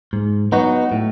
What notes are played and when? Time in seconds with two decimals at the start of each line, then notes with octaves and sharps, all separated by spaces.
0.13 G#2
0.52 F#3 B3 D#4 F#4
0.92 A2